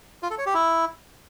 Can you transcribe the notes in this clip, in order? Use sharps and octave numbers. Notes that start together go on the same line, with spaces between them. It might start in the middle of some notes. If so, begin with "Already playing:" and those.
F4
A4
C#5
G4
E4